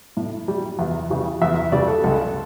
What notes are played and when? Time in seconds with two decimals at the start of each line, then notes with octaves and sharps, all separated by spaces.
0.17 A2
0.48 G3
0.79 E2
1.10 C#3 E3 G3
1.42 E2 E5
1.72 C#3 E3 G3 D5
1.88 A4
2.04 C#2 A4